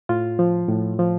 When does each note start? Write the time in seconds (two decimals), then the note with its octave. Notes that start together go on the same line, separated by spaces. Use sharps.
0.09 A2 F4
0.39 F3
0.69 A2
0.99 F3